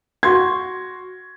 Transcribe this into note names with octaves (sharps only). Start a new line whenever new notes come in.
F#4 C6 G#6